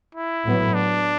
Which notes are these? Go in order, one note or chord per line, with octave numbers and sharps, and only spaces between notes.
E4
A2 F#3 B3
D4